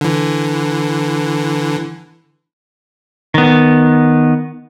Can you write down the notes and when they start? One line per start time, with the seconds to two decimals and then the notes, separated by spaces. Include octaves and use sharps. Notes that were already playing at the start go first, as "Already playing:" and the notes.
0.01 D3 E3
3.34 D#3 B3